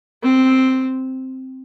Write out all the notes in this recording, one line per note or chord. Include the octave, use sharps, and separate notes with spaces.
C4